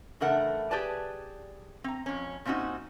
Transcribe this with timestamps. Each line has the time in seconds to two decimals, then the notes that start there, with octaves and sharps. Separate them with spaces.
0.20 C#3 E3 A3 D4 A#4 F#5
0.71 G4 G#4 B4 D5 A5
1.84 C4 A#5
2.06 F2 C#4
2.45 A#2 C4 C#4 D#4 F#4